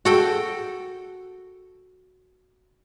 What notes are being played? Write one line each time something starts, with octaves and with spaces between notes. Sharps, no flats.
F#4 A4 G5